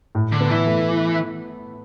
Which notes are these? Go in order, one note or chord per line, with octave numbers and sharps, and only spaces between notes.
A2
D3
B3
E3
A3